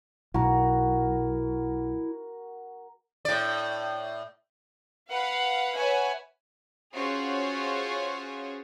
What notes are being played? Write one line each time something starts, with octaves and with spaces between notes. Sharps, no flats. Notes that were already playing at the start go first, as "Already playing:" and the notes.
B1 E4 F#4 A#4
A2 D5
B4 F5 F#5
B4 C#5 E5 F#5 G#5
C#4 F4 F#4 G#4 C5 C#5